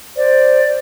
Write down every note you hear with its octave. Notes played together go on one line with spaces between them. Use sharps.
C5 D5